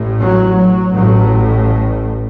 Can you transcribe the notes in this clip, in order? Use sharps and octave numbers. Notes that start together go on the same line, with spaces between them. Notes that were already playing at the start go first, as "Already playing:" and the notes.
Already playing: A1 A2
F#3
F#3
A1 A2 F#3